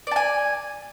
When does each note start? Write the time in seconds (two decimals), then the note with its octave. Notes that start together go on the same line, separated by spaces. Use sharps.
0.07 D5
0.11 A5
0.16 G#5